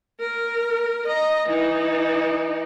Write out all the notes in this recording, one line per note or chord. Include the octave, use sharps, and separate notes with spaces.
A#4
D#5 A#5
E3 D#4